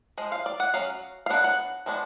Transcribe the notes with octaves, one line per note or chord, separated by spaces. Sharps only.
F3 G#3
F5
D5
F#5
F#3 C#4 F5
F5
F#3 B3 D4 F#5
F#5
F3 G#3 B3 D4